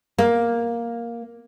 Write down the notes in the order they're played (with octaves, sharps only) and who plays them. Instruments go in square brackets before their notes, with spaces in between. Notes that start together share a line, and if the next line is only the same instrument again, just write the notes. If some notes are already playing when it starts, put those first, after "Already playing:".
[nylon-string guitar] A#3